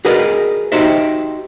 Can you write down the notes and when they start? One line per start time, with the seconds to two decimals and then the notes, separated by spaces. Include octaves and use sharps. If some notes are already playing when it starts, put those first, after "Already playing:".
0.05 F#4 G#4 A#4 B4 D5 D#5
0.72 D#4 F#4 G4 C5 D#5 E5